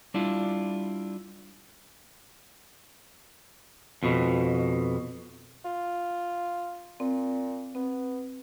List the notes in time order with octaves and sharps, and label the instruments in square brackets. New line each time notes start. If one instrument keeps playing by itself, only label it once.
[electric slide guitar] G3 D4 E4 F4
[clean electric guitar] F2 B2
[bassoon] F4
[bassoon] A#2 [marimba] C4
[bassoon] B3 [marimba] C4